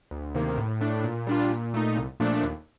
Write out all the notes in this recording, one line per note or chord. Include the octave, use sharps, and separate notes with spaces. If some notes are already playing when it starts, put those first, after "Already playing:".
D2
C3 D#3 A#3
A2
A3 D4
A#2
G3 D4 F4
A#2
A3 D#4
C2
A#2 F3 A3 D4
D#2